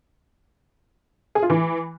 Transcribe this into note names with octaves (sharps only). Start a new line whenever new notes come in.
G#4
F4
E3